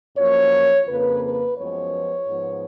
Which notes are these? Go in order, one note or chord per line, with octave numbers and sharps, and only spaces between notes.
F#2 F3 A#3 C#5
F2 C#3 F3 A#3 B4
B4
F#2 F3 G#3 B3 C#5
G#2 F3 B3